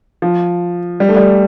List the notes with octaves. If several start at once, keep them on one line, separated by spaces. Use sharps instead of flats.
F3
G3
A3
G3